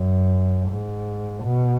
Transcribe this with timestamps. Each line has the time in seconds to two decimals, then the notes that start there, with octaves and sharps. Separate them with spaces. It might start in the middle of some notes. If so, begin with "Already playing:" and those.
Already playing: F#2
0.69 G#2
1.44 B2